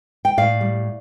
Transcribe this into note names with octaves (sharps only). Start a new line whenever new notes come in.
G5
A2 D5 F5
G3